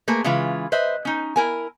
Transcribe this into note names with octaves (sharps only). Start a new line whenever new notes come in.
A3 A#3 G#4 B4
C#3 E3 G#3 F4 B4
B4 C5 D#5 E5
C#4 D#4
E4 A#4 G#5